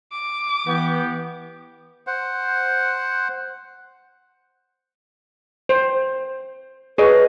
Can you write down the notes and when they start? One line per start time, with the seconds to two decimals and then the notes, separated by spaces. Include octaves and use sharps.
0.12 D6
0.67 E3 B3 G4
2.07 C5 F#5
5.69 C5
6.98 G#4 B4 C#5 D#5